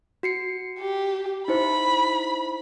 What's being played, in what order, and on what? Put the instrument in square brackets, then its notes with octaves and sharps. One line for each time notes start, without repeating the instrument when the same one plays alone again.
[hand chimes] F#4 C7 C#7
[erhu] G4
[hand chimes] D#4 E4 C5 [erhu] B5